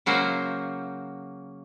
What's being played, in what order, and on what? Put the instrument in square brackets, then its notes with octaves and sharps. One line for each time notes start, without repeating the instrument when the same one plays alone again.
[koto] C#3 F#3 A#3 F#4 C5